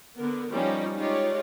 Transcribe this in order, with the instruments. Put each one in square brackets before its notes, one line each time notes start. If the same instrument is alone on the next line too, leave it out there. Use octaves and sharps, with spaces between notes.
[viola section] D3 B3 A#4
F3 G3 C#4 D#4
G#3 D#4 F4 G4 C#5 D5